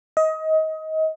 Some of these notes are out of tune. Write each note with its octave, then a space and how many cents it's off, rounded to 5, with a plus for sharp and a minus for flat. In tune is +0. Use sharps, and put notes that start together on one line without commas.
D#5 +25